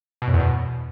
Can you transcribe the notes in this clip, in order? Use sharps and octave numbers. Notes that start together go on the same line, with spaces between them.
B2
F#2
E2
B2